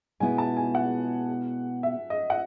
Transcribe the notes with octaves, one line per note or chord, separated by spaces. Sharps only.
B2 G#3 B3 E4 G#5
A5
G#5
F#5
E5
D#5
F#5